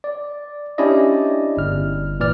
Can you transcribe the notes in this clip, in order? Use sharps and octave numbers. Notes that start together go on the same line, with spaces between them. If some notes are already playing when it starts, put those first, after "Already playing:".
D5
C#4 D4 E4 G4 D5 D#5
G1 F6
A#2 E3 D5 F6